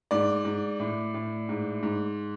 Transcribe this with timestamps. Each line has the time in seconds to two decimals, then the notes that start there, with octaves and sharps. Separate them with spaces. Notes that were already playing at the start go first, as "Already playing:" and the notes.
0.11 G#2 D5
0.45 G#2
0.80 A2
1.14 A2
1.49 G#2
1.83 G#2